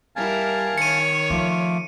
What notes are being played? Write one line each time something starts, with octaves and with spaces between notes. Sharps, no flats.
G3 E4 A#4 F5 G#5 A5
D#3 C#5 C#7 D#7
F3 A3 F4 D6